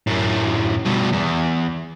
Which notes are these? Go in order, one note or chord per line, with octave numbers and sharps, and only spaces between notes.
F#2 A2
G2 B2
E2